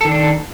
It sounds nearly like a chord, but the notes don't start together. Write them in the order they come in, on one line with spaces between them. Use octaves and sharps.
A4 D#3 D4